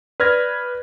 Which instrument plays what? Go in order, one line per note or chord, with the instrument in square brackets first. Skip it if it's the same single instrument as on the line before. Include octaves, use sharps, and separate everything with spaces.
[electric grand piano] B4 D5 F6 G#6 A#6